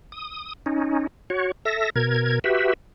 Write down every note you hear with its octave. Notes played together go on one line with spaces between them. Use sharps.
D#6
C#4 D#4
F#4 C#5
A4 E5 A#6
B2 A#4 G#6
F#4 G4 B4 E5